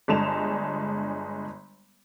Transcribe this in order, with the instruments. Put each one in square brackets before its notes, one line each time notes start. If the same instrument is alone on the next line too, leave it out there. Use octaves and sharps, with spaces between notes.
[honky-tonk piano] G1 G#3 D4 A5 E7 F7